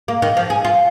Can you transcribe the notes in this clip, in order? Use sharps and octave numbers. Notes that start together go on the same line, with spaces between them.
A#3
D#3
F3
G#4
F4